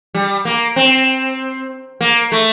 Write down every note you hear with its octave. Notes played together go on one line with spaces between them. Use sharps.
G3
A#3
C4
A#3
A3